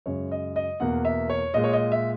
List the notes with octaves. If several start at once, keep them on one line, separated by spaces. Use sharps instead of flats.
F#2 C#3 G#3 C#5
D#5
D#5
E2 B2 A#3 F#5
E5
C#5
A#2 G#3 D#5
C#5
D#5
E5